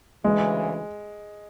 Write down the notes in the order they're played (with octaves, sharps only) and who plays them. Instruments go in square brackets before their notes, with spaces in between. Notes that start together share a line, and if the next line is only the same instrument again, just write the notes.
[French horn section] D2 C#3 E3 [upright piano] G#3